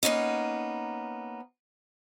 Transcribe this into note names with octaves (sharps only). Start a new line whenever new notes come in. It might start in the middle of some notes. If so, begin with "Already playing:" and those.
A#3 B3 C#4 D#4